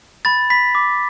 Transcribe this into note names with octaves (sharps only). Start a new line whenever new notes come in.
B5 A6
B5 B6
D6